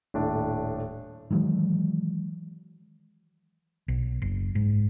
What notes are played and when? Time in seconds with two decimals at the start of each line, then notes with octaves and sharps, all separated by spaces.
0.14 D#1 A2 D4
1.31 D#3 E3 F#3 G#3
3.88 B1
4.22 F#1
4.55 G#2